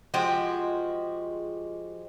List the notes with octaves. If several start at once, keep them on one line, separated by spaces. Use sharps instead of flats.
F3 G#3 F#4 G4